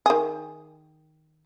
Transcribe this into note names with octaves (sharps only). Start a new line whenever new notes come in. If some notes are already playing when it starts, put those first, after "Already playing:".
D#3 G#4